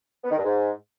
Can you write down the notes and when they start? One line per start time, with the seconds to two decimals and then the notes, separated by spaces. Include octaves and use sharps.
0.24 B3
0.31 D#3
0.37 G2
0.44 G#2